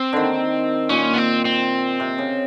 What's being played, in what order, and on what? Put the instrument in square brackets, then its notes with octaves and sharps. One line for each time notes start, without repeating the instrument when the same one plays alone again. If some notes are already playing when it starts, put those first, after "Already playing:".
Already playing: [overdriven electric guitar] C4
[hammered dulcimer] D3 D#3
[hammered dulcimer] A#2 [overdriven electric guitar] C#4
[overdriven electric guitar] B3
C4
C4
[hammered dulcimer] C3
C#3